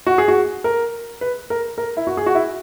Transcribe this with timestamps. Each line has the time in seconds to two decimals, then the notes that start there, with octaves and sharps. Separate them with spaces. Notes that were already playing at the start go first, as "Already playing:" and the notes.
0.07 F#4
0.18 G#4
0.28 F#4
0.64 A#4
1.21 B4
1.50 A#4
1.78 A#4
1.97 E4
2.07 F#4
2.17 G#4
2.26 F#4
2.35 E4